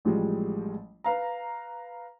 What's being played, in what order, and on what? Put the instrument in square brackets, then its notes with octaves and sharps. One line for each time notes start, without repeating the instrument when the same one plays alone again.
[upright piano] A1 F3 G3 G#3
B4 F5 A#5